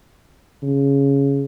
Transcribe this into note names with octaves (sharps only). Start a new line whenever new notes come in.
C#3